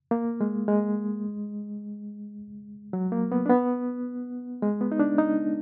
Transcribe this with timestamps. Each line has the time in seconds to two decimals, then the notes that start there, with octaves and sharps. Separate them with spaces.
0.11 A#3
0.41 G#3
0.68 G#3
2.93 F#3
3.12 A#3
3.32 B3
3.46 D4
3.49 B3
4.62 G#3
4.81 B3
4.92 D#4
5.00 D4
5.18 D#4